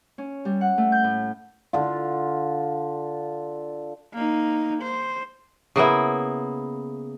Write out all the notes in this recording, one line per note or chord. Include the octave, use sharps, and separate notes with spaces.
C#4
G3
F#5
A3
G6
A2
D3 F4
A#3 D#4
C5
C#3 A#3 B3 E4